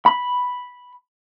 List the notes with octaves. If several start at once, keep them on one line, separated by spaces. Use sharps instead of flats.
B5